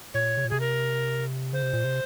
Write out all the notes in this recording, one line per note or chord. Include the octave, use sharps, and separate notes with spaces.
A#2 C#5
C3
A#2
C3 G#4
A#4
C#3 C5
C3
A#2
C3